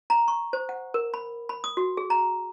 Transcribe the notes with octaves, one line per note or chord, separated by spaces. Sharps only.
A#5
C#6
C5
F#5
A#4
B5
B5
D#6
F#4
G#4
A#5